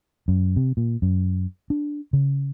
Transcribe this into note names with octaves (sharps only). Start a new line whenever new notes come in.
F#2
C3
A#2
F#2
D4
C#3